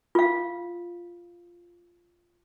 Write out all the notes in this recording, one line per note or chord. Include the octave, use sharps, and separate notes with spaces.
F4 F5